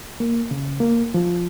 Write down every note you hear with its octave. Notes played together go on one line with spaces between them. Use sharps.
A#3
C#3
A#3
F3